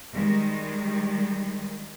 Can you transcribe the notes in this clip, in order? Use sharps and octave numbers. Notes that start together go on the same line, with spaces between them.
D#3 G3 G#3